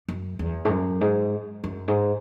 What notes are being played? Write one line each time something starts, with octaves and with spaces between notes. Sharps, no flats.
F#2
E2
G#2
F#2
G#2
F#2
G#2